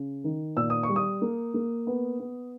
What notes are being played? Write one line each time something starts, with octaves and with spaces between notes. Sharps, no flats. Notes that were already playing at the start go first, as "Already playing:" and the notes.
Already playing: C#3
D#3
A#2 E6
D#6
C#6
G3
D#6
A#3
A#3
B3
B3